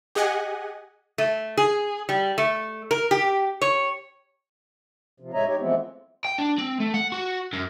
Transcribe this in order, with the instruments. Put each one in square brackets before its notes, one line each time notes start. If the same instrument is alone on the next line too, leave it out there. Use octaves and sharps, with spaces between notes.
[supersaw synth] G4 G#4 D#5 F#5 G#5
[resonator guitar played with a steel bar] A3
G#4
G3
A3
A#4
G4
C#5
[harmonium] C3 F3
A2 G#3 C#5 D#5 E5 A#5
D#4 G4 C#5
E3 F3 G#3 A3 B3 C4
[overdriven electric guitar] G5
D4
C4
A3
F#5
F#4
F#2